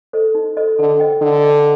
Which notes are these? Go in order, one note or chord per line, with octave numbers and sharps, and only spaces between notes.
A4 C5 D#5
D#4
A4 C5 D#5
D3 A4
C5 D#5 G5
D3 A4
C5 D#5 G5